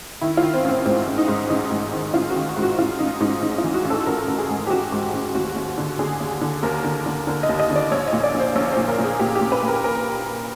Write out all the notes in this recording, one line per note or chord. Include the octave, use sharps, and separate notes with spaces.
D#3 E4
F4
D#3
C4
A1
C4
G#2 C4
A1
D#4
G#2
A1 D#4
G#2
D#3
A1 F4
F#4
D#3
G#2
F#4
A1 F4
A1 D#4
G#2 D#4
A1 D#4
F4
E3
F#4
A1
A4
A1 A#4
A1
G#4
G#2
G4
A1 F#4
G#2
A1
D#2 F#4
D#2
D3
D3 G#4
D#2
D3
D#2 A#4
D3
D3
D3 A#4
D#5
D#2
D#5
D3
D5
A#1 C#5
D#5
A#2
D5
A#1
C5
A#1 C#5
C5
A#2
A#4
A#2
G#4
A#2 G4
G4
A#2
B4
A#2
A#4
A#4